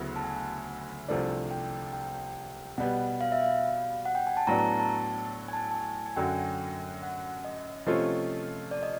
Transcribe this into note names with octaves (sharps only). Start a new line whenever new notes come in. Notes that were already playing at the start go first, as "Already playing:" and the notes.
Already playing: D2 C#3 F#3 B3 E4
A5
G#5
C2 C3 F3 A3 D4
G5
G5
B2 G3 B3 F#5
F5
E5
F5
F#5
G5
G#5
A5
A2 F#3 B3 D4 A#5
A#5
A5
G#5
A5
A5
G#5
G#5
F#2 D3 F#3 G5
F#5
D#5
C3 F3 A3 C#4 F4 D#5
D5
D#5